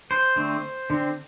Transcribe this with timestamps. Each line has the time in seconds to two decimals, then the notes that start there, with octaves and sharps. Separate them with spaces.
0.11 C5
0.36 D3 A3 C4
0.90 D3 C4